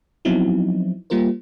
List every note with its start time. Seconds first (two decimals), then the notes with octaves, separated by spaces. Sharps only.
0.25 F3 F#3 B3 C4 D#4 E4
1.10 G3 A#3 F4 A#4 C5